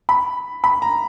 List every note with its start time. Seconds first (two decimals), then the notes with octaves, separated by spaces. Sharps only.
0.09 B5
0.64 B5
0.82 A#5